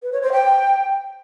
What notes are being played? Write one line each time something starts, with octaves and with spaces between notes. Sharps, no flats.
B4
C#5
C5
G5